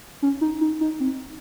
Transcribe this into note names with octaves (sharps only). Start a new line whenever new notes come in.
C#4
D#4
D#4
D#4
C4